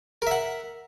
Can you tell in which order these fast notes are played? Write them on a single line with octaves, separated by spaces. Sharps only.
A#4 E5 F#5